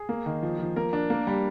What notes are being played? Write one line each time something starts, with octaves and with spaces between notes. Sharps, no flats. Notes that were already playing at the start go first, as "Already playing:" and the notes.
Already playing: G#4
A#3
D#3
F3
F3
A#3 A#4
D4
A#3
G3